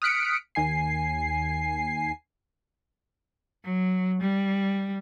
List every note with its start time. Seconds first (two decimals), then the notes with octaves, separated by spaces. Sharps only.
0.02 D#6 F6 F#6 B6 C#7 D7
0.55 D#2 G#5 C7
3.64 F#3
4.20 G3